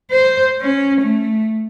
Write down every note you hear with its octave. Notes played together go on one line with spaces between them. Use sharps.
C5
C#4
A3